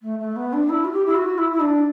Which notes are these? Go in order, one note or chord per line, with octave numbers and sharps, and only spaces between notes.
A3
A3
B3
D4
E4
F#4
G4
E4
F#4
E4
E4
D4